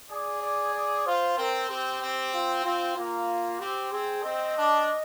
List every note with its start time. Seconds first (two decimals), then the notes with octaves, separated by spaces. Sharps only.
0.11 G#4 D5
0.42 D5
0.74 D5
1.06 F4 C5
1.37 C4 A#4
1.69 C4 G4
2.01 C4
2.34 F4
2.64 C4 F4
2.96 A#3 F4
3.60 C4 G4
3.92 C4 G#4
4.23 C4 D#5
4.56 D4